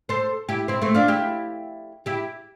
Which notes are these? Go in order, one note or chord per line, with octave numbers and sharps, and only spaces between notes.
A4 C5
E4 G4
C4 E4
A3 C4
D4 F4
E4 G4
E4 G4